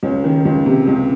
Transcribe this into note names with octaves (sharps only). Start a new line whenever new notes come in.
C#2 C#4
D#3
C#2
C3
C#2